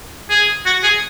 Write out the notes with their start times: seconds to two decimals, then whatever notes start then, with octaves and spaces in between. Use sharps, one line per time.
0.30 G#4
0.66 F#4
0.83 G#4